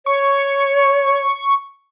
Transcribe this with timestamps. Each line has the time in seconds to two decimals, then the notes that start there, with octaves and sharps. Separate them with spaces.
0.06 C#5 C#6